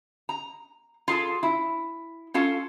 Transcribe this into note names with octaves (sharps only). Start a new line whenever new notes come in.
A#5
F4 G#4 A4
E4
C#4 F4 A4